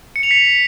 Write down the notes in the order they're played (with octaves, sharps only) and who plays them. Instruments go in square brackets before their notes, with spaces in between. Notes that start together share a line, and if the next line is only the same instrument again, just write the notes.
[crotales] C#7
F7
B6